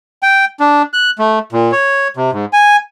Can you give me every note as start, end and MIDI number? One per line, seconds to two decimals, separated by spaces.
0.23 0.45 79
0.60 0.82 62
0.93 1.10 90
1.19 1.39 57
1.52 1.72 46
1.72 2.08 73
2.17 2.31 48
2.32 2.45 44
2.53 2.76 80